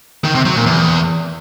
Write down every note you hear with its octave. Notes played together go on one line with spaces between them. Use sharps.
D#3
C3
F#3
A#2
E2